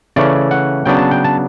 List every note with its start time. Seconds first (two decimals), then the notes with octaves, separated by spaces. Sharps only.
0.16 C#3 E3 A3 C#4 D5
0.51 F#5
0.86 C#3 F#3 B3 D4 G5
0.99 A5
1.11 G5
1.24 A5